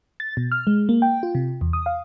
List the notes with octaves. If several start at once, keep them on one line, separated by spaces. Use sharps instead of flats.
A6
B2
F6
G#3
A#3
G5
F4
C3
E2
D#6
F5